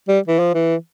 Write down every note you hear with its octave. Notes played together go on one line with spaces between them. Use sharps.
G3
E3
F3
E3